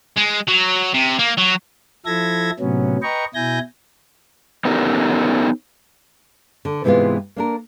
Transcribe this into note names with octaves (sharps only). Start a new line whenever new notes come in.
G#3
F#3
C3
A#3
F#3
F3 E4 A4 E5 G#6 A#6
A2 C3 F#3 B3 C#4
B4 D#5 G5 A#5 C#6
B2 E4 G#5 G6 A#6
B3 C#4 D#4 G4 A4 A#4
D3
G#2 C3 E3 G#3 B3 F4
A#3 D4 A#4